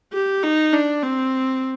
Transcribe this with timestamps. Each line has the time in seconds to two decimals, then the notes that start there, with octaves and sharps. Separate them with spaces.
0.13 G4
0.43 D#4
0.73 D4
1.03 C4